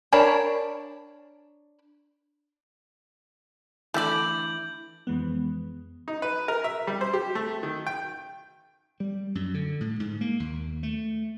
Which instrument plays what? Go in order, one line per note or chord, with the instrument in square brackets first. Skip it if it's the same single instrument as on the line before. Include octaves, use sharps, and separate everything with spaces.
[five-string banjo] D4 A#4 C#5 A5 B5
[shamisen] D3 A3 [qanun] E3 D5 [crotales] G6 F#7
[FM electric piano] F2 E3 G#3 B3
[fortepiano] D#4
B4
A#4
E5
G3
C5
G4
A3
D#3
G5
[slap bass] G3
F#2
D3
A2
G#2
A#3
D#2
A3